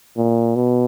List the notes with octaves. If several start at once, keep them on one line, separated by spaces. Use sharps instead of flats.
A#2
B2